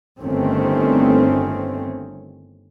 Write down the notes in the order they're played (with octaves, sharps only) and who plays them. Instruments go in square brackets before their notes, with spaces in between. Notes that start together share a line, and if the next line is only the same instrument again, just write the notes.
[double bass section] G1 G2 D#3 A3 C4 C#4